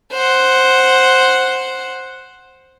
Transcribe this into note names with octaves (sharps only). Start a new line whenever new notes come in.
C5 F#5